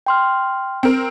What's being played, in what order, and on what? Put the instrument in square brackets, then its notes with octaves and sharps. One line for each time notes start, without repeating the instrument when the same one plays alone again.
[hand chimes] G5 C6 F6
[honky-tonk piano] C4 A#4